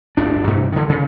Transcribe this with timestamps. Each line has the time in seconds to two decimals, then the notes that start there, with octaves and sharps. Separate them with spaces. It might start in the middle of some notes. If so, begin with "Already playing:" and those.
0.17 D1 G1 D4
0.47 G2 C3
0.72 D3 D#3
0.89 C#3